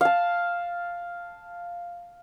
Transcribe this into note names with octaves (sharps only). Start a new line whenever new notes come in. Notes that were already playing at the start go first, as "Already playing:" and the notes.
F5 A5